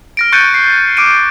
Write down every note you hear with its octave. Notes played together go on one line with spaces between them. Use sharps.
F6 A#6 D7
C#6 F#6 G6 A6 C#7 D#7
C7
D6 F6 D7 D#7